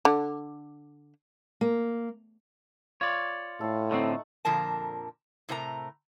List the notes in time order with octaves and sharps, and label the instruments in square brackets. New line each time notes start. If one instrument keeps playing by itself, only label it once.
[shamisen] D3
[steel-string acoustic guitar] A#3
[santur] F4 [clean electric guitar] C#5 D5
[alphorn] A2 [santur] A4 F5
[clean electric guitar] D3 C4 [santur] A3 D#4 F#5
[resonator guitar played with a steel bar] F2 A#2 D3 F3 A#4 A5
A2 C3 A#4 C5 A#5